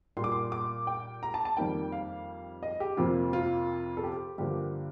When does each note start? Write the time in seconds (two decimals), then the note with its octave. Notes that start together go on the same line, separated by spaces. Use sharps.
0.17 A#2 G3 A#3 C6
0.24 D6
0.32 C6
0.52 D6
0.87 G5
1.23 A#5
1.34 A5
1.45 A5
1.57 F2 D#3 G3 A#3 G5
1.92 F5
2.63 D#5
2.80 G4
2.97 F2 C3 F3 A#3 F4
3.33 F4
3.97 A4
4.03 G4
4.38 G2 D3 F3 A#3 G4